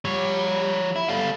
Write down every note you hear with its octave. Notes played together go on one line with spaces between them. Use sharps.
F3 G3 C#5
E4
C#2 G3 A4 F5